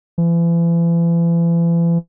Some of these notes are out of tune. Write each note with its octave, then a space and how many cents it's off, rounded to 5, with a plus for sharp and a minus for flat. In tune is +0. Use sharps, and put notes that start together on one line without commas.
E3 +40